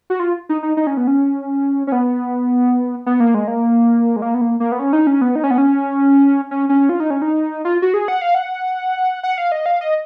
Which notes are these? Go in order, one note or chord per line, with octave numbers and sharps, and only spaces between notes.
F#4
F4
D#4
D#4
D#4
C#4
B3
C#4
C#4
B3
B3
A#3
G#3
A#3
G#3
A#3
B3
A#3
A#3
B3
C#4
D#4
C#4
B3
D#4
C#4
B3
C#4
C#4
C#4
F4
D#4
C#4
D#4
F4
F#4
G#4
F#5
F5
F#5
F#5
F5
D#5
F5
D#5